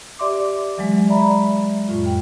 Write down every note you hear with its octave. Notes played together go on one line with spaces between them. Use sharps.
G4 D5 E5 C6 D6
E3 F#3 G#3
D5 E5 A#5 B5
F2 A2 F4
G5